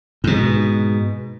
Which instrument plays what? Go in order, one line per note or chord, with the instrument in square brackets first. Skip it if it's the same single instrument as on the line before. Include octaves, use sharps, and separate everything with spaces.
[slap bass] G#2 B2